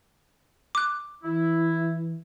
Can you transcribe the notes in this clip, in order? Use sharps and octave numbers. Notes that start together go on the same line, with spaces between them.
D6 F#6
E3 E4